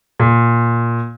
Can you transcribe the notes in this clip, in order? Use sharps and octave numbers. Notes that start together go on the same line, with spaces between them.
A#2